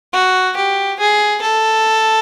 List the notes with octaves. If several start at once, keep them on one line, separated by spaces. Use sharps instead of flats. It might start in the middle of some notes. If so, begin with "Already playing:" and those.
F#4
G4
G#4
A4